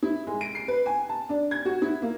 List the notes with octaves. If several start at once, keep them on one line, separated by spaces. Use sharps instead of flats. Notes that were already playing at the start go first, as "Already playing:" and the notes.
E4
G#3
D7
C7
B4
G#5
A5
D4
G#6
F#4
E4
A#3